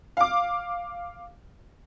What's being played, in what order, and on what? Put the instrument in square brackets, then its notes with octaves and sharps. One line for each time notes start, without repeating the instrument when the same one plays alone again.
[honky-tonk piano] F5 D6